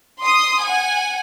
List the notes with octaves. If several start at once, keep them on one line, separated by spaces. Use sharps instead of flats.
C6 D#6
F#5 G#5